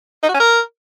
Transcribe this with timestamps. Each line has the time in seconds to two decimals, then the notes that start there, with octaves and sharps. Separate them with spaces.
0.23 D#4
0.29 F#4
0.34 C#4
0.40 A#4